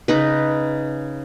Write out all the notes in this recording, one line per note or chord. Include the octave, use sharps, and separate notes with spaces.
C#3 D#4 B4